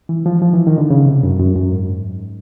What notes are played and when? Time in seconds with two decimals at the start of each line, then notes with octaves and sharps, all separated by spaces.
0.09 E3
0.26 F3
0.42 F3
0.54 E3
0.67 D#3
0.78 D3
0.90 C#3
1.06 C3
1.23 F#2
1.39 F#2
1.56 F#2
1.72 G#2